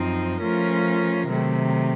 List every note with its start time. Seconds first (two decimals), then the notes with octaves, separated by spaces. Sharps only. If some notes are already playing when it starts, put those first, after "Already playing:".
Already playing: F#2 F3 C4 D#4
0.40 F3 A3 C#4 F4 A#4
1.28 C3 D#3 F#3 A3